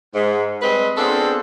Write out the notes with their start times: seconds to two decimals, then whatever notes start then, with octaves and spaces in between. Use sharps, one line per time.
0.15 G#2
0.62 G3 G#3 C4 B4 D#5 B5
0.97 B3 C4 D4 F4 G#4 A4